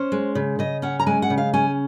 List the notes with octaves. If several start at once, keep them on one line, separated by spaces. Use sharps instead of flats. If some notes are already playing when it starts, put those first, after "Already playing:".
Already playing: C#4 C5
G#3
C#3
C#3 D#5
C#4 F#5
A#5
G#3 G#5
F#5
C#3
F5
C#4 G#5